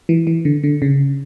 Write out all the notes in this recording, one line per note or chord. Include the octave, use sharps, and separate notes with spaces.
E3
E3
D3
D3
C#3